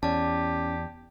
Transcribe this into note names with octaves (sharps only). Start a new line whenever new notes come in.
E2 C#4 G4 D5 A5